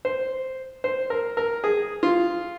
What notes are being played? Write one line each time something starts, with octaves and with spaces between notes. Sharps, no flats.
C5
C5
A#4
A#4
G#4
F4